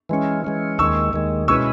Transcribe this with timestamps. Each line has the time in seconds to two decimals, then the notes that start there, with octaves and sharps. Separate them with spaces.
0.09 E3 G#3 C#4
0.44 E3 G#3 C#4
0.78 D#2 D#3 G#3 C#6 E6
1.13 D#2 D#3 G#3
1.48 B2 G#3 C#4 E4 B4 C#6 E6